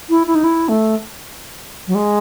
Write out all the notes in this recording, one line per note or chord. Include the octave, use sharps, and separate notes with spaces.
E4
E4
D#4
E4
A3
F#3
G#3